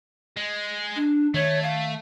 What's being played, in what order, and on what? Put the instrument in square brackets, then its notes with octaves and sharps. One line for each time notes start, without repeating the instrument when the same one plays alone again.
[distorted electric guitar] G#3
[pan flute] D4
[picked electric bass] D#3 [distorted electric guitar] A3 [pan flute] C#5
[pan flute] F5